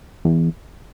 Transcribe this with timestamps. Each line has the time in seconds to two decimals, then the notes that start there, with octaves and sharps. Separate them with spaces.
0.25 E2